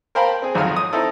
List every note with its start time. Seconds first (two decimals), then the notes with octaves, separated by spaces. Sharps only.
0.15 A#4 C5 F5 G5 A5 B5
0.42 C4 G#4
0.55 G#1 F2 F#3 D#4 F5 F6
0.76 D#6
0.93 C4 D#4 E4 A4